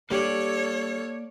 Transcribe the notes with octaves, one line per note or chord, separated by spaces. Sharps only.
G3 A#3 D4 G4 A4 C#5 D5